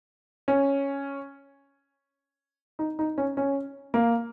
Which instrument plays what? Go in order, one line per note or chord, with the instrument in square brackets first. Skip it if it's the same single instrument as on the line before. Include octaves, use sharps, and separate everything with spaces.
[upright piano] C#4
D#4
D#4
C#4
C#4
A#3